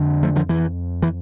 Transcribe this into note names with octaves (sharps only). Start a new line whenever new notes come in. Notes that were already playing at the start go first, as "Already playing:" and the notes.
Already playing: F2 D3
F3 A3
D3 F3
E3
E3